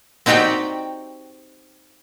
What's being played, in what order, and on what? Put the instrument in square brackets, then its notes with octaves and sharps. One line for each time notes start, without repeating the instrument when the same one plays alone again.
[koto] C4 D#4 F#4 G4 D5 G5